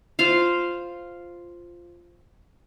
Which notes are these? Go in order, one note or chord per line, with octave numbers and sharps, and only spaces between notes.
F4 C5 F5